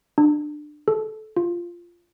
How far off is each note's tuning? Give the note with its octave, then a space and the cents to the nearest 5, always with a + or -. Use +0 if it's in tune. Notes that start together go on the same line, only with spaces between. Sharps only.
D4 +25
A4 -20
F4 -10